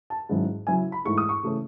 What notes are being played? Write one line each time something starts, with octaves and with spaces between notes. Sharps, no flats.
A5
G#2 D#3 F#3 C#4 E4
C#3 F#3 C#4 E4 G#5
B5
G#2 E3 A3 E4 C#6
D#6
C#6
C#3 E3 A3 C#4